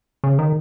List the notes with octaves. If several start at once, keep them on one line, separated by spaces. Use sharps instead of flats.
C#3
D#3